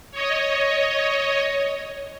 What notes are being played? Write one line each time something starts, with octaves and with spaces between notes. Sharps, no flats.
C#5 D#5